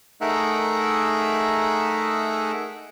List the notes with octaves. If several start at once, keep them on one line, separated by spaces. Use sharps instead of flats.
A3 D#4 G#4 A#4 E5 F#5